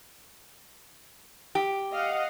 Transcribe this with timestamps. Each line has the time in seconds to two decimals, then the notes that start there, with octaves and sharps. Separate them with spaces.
1.55 G4
1.94 D#5 F5 F#5